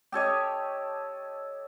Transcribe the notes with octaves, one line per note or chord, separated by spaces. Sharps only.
G4 A4 C#5 D#5